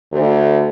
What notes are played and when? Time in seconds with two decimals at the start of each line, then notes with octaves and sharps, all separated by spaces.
0.12 D2